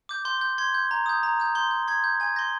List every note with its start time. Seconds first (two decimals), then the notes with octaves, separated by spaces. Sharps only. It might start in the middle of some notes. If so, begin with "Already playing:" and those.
0.09 D6 G6
0.25 C6 G6
0.41 G6
0.58 C6 G#6
0.74 G6
0.91 A#5
1.06 D#6 G6
1.23 A#5
1.40 D#6 G6
1.55 C6 G6
1.71 G6
1.88 C6 G#6
2.04 G6
2.20 G#5 G#6
2.36 C6 G6 A#6